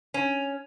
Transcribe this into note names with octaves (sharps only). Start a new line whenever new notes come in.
C#4